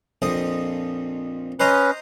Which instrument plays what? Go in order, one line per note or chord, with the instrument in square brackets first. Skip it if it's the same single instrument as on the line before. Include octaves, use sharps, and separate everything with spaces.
[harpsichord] A#1 F2 D#5
[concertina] C#4 B4 [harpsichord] C5 D#5 A#5